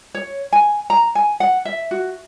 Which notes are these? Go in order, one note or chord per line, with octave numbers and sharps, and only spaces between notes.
C#5
G#5
A#5
G#5
F#5
E5
F#4